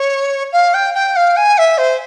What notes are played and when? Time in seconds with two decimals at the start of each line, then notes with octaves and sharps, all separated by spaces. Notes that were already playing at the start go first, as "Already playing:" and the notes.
Already playing: C#5
0.52 F5
0.74 G5
0.94 G5
1.16 F5
1.36 G#5
1.58 E5
1.78 C5